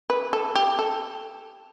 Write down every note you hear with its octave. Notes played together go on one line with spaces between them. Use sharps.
B4
A4
G4
A4